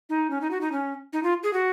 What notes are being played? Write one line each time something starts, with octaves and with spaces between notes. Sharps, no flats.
D#4
C#4
D#4
F#4
D#4
C#4
D#4
F4
G#4
F#4